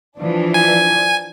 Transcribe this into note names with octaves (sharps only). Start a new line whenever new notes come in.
E3 F3 D4
G#5